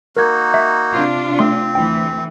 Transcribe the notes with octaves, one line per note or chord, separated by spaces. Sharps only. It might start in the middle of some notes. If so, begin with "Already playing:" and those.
A#3 D#4 F#4 A#4 G#6
E5
C3 D4 F4
A3 C4 C6
D2 E3 G5